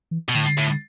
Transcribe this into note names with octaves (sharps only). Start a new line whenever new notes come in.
E3
B2
A2 D3
A2